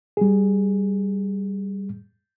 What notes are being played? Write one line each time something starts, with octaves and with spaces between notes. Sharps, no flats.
G3 G#4